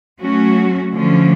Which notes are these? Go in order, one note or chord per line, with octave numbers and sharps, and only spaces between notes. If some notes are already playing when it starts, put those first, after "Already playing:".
F#3 A3 C#4 F#4
D3 F3 A3 C#4